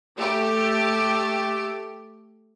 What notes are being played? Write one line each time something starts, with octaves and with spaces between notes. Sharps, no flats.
A3 G4